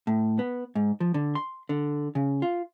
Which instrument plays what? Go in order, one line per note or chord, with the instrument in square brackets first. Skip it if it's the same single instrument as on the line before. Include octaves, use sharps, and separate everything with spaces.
[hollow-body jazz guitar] A2
B3
G#2
F3
D3
C6
D3
C#3
F4